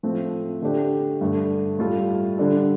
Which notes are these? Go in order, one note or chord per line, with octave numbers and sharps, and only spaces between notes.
A2 F3 A3 C4
D3 A3 D4 G4
G2 D3 A3
A2 G3 F4 A4
D3 G3 D4 A4